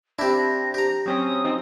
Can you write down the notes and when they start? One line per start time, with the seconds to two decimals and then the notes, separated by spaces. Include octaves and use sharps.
0.19 C4 D4 E4 G4 A#6
0.74 G4 A#5
1.06 F#3 C4 C#4 D#6
1.44 F3 C4 D#4